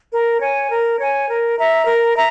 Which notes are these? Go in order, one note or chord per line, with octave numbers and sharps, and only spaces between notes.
A#4
C#5 G#5
A#4
C#5 G#5
A#4
E5 A#5
A#4
E5 A#5